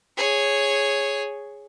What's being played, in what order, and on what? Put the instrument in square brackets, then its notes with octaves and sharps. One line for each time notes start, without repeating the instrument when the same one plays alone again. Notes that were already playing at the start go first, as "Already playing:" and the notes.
[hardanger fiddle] G#4 C#5